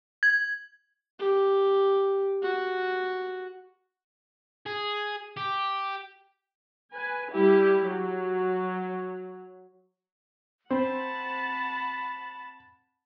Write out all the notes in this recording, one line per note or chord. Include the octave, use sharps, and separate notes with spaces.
G#6
G4
F#4
G#4
G4
B4 G#5
G3 E4 G4
F#3
C4 C5 F#5 A5 B5